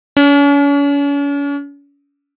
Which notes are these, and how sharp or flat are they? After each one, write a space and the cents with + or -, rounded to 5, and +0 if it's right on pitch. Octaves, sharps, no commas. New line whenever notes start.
C#4 +40